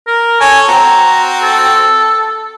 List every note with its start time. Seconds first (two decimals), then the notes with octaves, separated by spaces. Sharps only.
0.07 A#4
0.41 A4 C#5 G#5
0.68 C4 F#4 A#5
1.43 A4